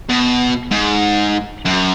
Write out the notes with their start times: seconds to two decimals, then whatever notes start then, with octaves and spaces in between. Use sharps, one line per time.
0.10 B2
0.71 G#2
1.65 F#2